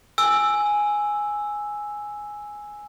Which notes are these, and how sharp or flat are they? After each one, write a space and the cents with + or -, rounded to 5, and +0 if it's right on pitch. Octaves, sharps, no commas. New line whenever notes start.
G#5 +0 E6 +0